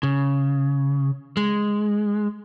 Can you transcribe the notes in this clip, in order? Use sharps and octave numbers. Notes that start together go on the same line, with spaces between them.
C#3
G#3